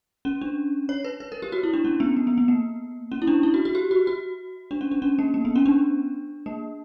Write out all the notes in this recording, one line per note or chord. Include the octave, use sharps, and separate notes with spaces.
C#4
D4
C#5
B4
B4
A#4
G4
F#4
E4
D4
C#4
B3
A#3
B3
B3
A#3
C#4
E4
D4
E4
F#4
F#4
G4
F#4
F#4
D4
C#4
D4
C#4
A#3
A#3
B3
C#4
D4
A#3